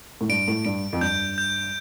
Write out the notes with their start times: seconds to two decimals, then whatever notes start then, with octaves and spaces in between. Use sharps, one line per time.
0.21 A2
0.29 G2 D7
0.48 A2
0.65 G2 D7
0.93 F2
1.01 G2 G6
1.38 G6